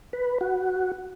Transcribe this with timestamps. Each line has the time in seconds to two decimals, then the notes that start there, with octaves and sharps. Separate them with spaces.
0.13 B4
0.41 F#4